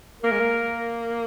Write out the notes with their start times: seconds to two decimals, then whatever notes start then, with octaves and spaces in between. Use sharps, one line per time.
0.22 A#3 A#4
0.31 G#3
0.40 A#3